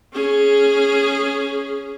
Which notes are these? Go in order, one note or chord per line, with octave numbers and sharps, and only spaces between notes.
C#4 G#4